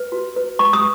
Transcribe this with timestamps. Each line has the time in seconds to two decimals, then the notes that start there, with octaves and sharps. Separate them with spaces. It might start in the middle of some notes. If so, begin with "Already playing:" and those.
Already playing: B4
0.12 F#4
0.36 B4
0.59 B4 C#6
0.73 D#6